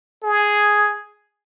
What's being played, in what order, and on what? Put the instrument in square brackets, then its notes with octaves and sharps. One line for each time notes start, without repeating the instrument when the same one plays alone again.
[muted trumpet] G#4